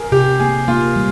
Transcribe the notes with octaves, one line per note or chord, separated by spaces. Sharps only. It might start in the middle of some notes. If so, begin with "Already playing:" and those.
Already playing: G#4 A#4
C3 G4
A#3 G#4
A#3 F4
G3